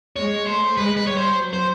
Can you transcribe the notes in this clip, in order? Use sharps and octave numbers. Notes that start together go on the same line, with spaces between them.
G#3 C#5
A3 C5
G#3 B4
B4
G3 C#5
C5
F#3
C5